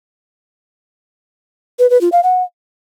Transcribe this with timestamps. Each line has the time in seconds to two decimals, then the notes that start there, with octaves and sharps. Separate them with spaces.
1.79 B4
1.90 B4
2.01 F4
2.12 F5
2.23 F#5